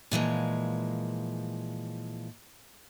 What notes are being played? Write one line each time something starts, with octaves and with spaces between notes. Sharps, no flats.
A#2 E3 F3 G#3